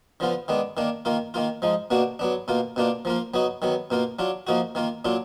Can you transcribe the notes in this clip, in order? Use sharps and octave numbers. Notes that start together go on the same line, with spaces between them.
D3 F3 B3 F4
D#3 G#3 B3 D4
D#3 A#3 D4
D#3 A#3 F4
D#3 A#3 F4
F3 G#3 D#4
B2 A#3 D4 F#4
F#3 B3 D4
B2 A#3 F4
B2 A#3 D4 F4
F3 A#3 F4
F#3 B3 D#4 F#4
D#3 F#3 B3
B2 A#3 F4
F#3 D4 F4
F3 A#3 D#4 F#4
D#3 A#3 F4
A#2 F#3 D4 F4